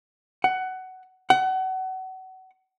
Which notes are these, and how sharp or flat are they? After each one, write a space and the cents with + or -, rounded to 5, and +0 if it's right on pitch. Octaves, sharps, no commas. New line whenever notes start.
F#5 +15
F#5 +30